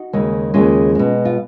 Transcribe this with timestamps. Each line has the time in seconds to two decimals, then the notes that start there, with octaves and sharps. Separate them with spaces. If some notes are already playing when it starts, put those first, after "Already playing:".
Already playing: D#4 F#4
0.13 D#2 C#3 G#3
0.54 D#2 C#3 G#3 C#4 F4
0.95 B2 G#3
1.25 F4